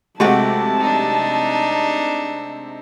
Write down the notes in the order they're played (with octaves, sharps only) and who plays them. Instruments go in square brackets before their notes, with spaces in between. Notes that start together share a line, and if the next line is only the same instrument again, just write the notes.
[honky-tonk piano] C3 G#3 [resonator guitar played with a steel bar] A3 F#4 G4 [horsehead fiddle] A5
[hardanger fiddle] D4 D#4